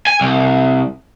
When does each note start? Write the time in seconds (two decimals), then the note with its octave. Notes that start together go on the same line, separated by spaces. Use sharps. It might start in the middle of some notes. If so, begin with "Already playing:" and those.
0.07 G#5
0.21 C2